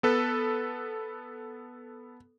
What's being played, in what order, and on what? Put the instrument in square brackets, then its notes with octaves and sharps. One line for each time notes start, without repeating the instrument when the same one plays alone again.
[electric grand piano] B3 A4 B4